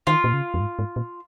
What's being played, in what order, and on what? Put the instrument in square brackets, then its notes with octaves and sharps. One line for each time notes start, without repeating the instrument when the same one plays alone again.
[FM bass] D#3 [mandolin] F4
[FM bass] A#2
C#3
F2
G#2
G#2
A#2